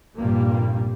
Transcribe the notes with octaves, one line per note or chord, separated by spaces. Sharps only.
F1 G2 A#2 G3 A#3